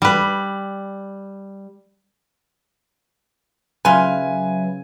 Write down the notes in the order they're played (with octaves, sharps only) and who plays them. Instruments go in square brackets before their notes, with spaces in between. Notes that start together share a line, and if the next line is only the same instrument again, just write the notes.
[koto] G3 B4
[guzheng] C#3 F4 [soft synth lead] F#3 [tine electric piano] B4 E5 [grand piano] G#5